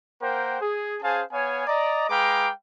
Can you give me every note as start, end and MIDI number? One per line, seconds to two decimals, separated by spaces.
0.22 0.60 58
0.22 0.60 70
0.22 0.60 72
0.22 0.60 78
0.22 0.60 79
0.61 0.96 68
1.03 1.22 61
1.03 1.22 68
1.03 1.22 72
1.03 1.22 77
1.03 1.22 80
1.03 1.22 81
1.32 1.65 59
1.32 1.65 73
1.32 1.65 77
1.32 1.65 80
1.68 2.08 74
1.68 2.08 75
1.68 2.08 82
2.10 2.49 56
2.10 2.49 71
2.10 2.49 77
2.10 2.49 79
2.10 2.49 82
2.10 2.49 86